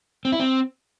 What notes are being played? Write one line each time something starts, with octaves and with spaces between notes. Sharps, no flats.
C4
E4
C4